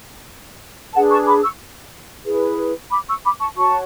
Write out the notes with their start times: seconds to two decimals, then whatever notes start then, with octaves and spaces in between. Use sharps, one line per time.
0.94 D4 G#4 B4 F#5 A5
1.10 A5 C#6
1.27 B5 D6
1.43 C#6 E6
2.25 E4 G#4 B4
2.91 B5 D6
3.07 C#6 E6
3.24 B5 D6
3.41 A5 C#6
3.57 F#4 C#5 A5 C#6